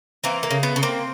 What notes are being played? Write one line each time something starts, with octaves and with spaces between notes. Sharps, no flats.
E3 A#3 C4
A#3
C#3
B3
C#3
A#3 C4